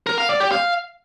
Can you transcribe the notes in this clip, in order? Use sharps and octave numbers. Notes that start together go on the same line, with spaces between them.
A#4
F5
D5
G4
F5